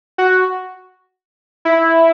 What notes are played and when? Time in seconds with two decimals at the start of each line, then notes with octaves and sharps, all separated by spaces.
0.18 F#4
1.65 E4